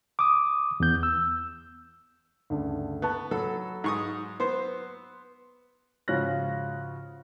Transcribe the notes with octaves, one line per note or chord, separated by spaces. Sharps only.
D6 D#6
E2 B3 G6
E6
D2 G2 C#3
B3 A5 C#6 F#6
F#3 A4 B5
G#2 C#6 D#6
B3 C5
G#2 C#3 F3 F#4 F#6 A#6